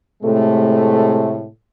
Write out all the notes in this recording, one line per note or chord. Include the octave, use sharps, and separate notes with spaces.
A2 C3 G#3 A3